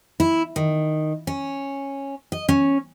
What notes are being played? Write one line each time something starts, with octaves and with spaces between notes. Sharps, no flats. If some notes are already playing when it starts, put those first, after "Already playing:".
E4
D#3
C#4
D#5
C#4